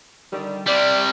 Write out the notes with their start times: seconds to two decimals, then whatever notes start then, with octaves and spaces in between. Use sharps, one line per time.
0.32 D3 D#3 G3
0.67 C3 G3 D5